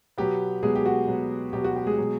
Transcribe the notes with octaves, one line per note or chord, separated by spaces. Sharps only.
B2 F#3 B3 G4
B2 F#3 G#3 B3 G#4
G4
F#4
B2 F#3 B3
B2 F#3 B3 G4
F#4
G4
G#3 G#4
B2 F#3